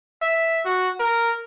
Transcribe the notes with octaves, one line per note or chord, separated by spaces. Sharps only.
E5
F#4
A#4